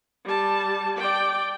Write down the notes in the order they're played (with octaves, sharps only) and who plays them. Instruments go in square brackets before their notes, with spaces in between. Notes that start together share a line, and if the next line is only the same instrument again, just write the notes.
[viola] G3 A5
D5 G5